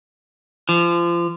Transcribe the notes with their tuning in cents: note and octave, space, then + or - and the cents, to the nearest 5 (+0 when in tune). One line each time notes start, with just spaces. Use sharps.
F3 -30